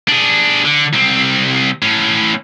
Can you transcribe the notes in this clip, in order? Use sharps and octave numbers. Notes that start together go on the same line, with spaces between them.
D4 G#4
D3
C2 C4
A2 C#4